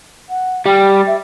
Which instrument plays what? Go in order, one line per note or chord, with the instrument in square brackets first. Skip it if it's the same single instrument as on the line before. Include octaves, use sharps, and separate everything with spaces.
[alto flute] F#5
[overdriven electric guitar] G3 [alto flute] G5
[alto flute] E5